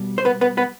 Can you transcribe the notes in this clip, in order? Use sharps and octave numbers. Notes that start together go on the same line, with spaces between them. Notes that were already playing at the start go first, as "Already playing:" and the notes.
Already playing: B2 G3
C5
B3 B4
B3 B4
B3 B4